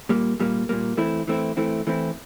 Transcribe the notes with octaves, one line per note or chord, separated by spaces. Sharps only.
A#2 G3 A#3
A#2 G3 A#3
A#2 G3 A#3
E3 A3 C4 E4
E3 A3 C4 E4
E3 A3 C4 E4
E3 A3 C4 E4